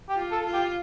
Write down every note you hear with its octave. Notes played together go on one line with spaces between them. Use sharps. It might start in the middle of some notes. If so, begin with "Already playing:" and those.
G4
F4
A4
F4
G4